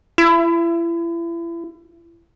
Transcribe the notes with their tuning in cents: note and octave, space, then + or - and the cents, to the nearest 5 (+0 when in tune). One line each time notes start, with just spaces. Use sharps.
E4 +35